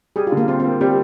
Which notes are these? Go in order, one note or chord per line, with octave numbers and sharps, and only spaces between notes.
G3 G#4
F4
D3
A#3
C4 F4
C4
A#3
G3 C4